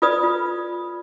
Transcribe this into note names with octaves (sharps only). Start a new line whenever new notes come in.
F4 A4 B4 D5 D#6
F4